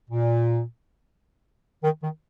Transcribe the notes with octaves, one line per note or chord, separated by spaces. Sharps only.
A#2
D#3
D#3